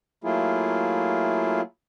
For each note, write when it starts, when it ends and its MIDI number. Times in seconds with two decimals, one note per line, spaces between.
0.24 1.61 54
0.24 1.61 57
0.24 1.61 58
0.24 1.61 64
0.24 1.61 65
0.24 1.61 68